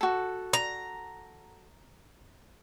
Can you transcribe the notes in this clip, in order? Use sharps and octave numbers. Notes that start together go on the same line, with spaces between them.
F#4 A4
A#5